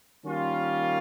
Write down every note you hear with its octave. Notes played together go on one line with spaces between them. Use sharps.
D#3 G3 A#3 C#4 F4